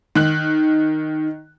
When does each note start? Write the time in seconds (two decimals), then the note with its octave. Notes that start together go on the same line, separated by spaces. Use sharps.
0.15 D#3 F#6